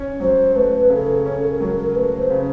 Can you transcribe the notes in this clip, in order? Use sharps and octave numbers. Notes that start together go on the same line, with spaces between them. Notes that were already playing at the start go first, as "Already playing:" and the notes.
Already playing: C#4
F#3 C5
A3 B4
C#3 A4
C#4 A4
A#4
F#3 A#4
A#4
A3 B4
C5
C#3